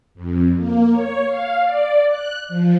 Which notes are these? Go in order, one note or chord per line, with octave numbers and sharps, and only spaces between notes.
F2
A#3
C#5
F5
D5
F#6
F3